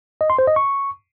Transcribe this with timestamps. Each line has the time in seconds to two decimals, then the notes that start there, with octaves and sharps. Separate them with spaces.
0.21 D#5
0.30 C6
0.39 C5
0.47 D#5
0.56 C#6